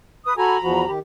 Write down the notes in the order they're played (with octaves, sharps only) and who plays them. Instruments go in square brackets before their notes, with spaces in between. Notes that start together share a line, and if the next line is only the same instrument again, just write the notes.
[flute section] B4 D#6
[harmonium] F#4 A4 G#5 [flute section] A#5 B5
[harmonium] E2 F3 F#4
D#3 G4